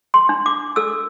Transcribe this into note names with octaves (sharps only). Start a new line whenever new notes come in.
C6
D4
D6
A4 E6